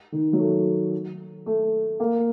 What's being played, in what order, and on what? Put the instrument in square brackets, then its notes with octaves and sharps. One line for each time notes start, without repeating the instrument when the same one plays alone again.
[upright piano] D#3
F#3
A3
A3
A#3